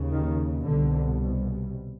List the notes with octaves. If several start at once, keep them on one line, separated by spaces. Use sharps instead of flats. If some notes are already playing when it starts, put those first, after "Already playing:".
Already playing: D#2 C#3
D#3
C2 B2 D3